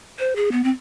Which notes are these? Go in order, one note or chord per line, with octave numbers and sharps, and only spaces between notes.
C5
G#4
B3
C4